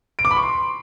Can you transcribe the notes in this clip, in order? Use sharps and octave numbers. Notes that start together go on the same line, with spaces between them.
D7
D6
B5
C#6
C6